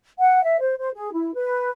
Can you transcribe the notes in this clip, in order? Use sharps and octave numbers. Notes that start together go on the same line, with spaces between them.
F#5
E5
C5
C5
G#4
E4
B4